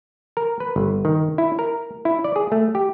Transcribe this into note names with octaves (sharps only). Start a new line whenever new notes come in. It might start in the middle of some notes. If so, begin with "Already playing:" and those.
A#4
B4
G1
D#3
E4
A#4
E4
D5
G#4
A3
G4